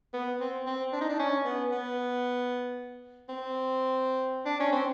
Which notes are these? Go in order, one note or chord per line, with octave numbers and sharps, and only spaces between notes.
B3
C4
C4
D4
D#4
D4
C#4
B3
B3
C4
D4
C#4
C4